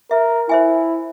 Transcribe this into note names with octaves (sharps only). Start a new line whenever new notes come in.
A#4 E5
E4 C5 E5 G#5